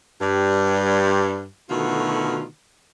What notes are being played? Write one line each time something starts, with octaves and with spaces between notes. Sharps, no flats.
G2 G3
B2 D3 D#3 A3 F4 F#4